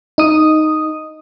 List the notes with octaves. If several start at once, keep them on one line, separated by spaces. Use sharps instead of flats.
D#4 D#6